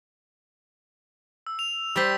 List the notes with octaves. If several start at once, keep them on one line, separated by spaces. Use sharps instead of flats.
E6
F7
G3 C5 E6 A6 B6